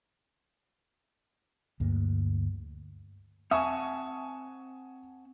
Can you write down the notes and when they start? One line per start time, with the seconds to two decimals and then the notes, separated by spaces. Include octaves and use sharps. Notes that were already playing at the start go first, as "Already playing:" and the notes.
1.80 D2 G2 A#3
3.51 C4 E5 F#5 G#5 A5 C#6 D#6